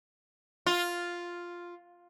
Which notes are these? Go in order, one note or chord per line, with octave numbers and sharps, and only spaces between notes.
F4